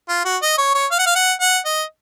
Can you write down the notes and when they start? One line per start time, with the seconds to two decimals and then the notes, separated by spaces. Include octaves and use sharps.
0.09 F4
0.25 F#4
0.42 D#5
0.58 C#5
0.75 C#5
0.91 F5
0.99 F#5
1.06 F5
1.15 F#5
1.41 F#5
1.65 D#5